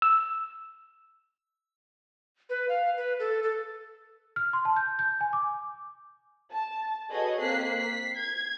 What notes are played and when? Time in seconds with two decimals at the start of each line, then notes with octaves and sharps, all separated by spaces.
0.02 E6
2.50 B4
2.69 F5
2.97 B4
3.19 A4
3.43 A4
4.36 F6
4.53 C6
4.65 A5
4.76 G6
4.99 G6
5.21 G#5
5.33 D6
6.52 A5
7.10 F#4 G#4 A4 B4 C#5 D#5
7.41 A#3 C4 F#6 B6 C7
7.80 B6 C7
8.18 G#6